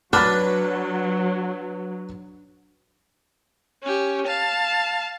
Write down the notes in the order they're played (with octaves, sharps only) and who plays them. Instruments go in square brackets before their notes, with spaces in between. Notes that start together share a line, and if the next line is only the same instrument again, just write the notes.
[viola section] F#3 [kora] D4 [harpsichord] B4 [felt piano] F6 A6
[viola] C#4 G4
F5 A5